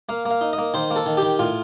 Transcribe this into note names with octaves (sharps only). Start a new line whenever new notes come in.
A#3 F5
A#3
F5
D#4
D#5
A#3
D#3 C5
A#3
A4
D#3
G4
D#3
A2 F4